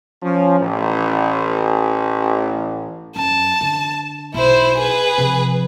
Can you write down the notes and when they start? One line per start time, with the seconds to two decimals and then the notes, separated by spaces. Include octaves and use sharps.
0.22 F3 C#4
0.59 A1
3.16 F#2 A5
3.61 D3
4.34 B1 E4 C5
4.78 G#4 B4
5.18 C3 F3